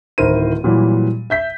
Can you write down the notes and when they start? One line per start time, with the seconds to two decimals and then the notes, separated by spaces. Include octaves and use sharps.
0.18 D1 D#3 E4 A#4 C5 D#7
0.64 A#2 E3 F#3 G3
1.30 E5 G6 B6